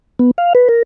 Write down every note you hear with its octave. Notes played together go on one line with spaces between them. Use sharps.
B3
F5
B4
A#4